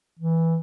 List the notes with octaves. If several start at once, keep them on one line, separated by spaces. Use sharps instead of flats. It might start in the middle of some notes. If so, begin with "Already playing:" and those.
E3